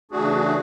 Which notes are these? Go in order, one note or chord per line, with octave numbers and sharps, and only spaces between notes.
C#3 E3 A3 D4 F#4 G#4